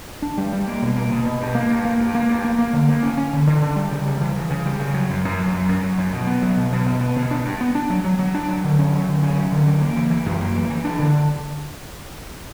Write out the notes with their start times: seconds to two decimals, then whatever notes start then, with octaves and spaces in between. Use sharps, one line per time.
0.22 D4
0.38 G3
0.52 G3
0.67 A#3
0.82 B2
0.96 A#3
1.11 B2
1.25 B2
1.41 G2
1.55 A#3
1.70 G2
1.85 A#3
2.00 G2
2.15 A#3
2.28 G2
2.44 A#3
2.58 A#3
2.73 D3
2.88 A#3
3.03 C#4
3.17 C#4
3.33 D3
3.47 D3
3.62 D3
3.76 G3
3.91 C#3
4.06 G3
4.21 E3
4.36 C#3
4.50 C#3
4.66 G3
4.80 C#3
4.94 F#3
5.10 F#2
5.25 F#2
5.39 F#3
5.54 F#2
5.69 F#2
5.83 F#3
5.98 F#2
6.12 B2
6.27 B3
6.42 F#3
6.57 B2
6.72 B2
6.86 B2
7.01 B3
7.16 B2
7.31 D4
7.45 G2
7.61 B3
7.75 D4
7.90 F#3
8.04 F#3
8.19 F#3
8.34 D4
8.49 F#3
8.64 D3
8.79 C#4
8.92 F#3
9.08 D3
9.23 C#4
9.38 F#3
9.52 D3
9.67 E3
9.81 A#3
9.96 E3
10.10 E3
10.26 F#2
10.41 A#3
10.55 E3
10.70 E3
10.85 D4
10.99 D3